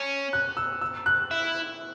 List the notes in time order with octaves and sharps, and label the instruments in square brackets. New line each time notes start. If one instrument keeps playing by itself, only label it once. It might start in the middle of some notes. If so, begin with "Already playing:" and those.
Already playing: [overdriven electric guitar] C#4
[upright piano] F#6
E6
E6
F#6
[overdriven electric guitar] E4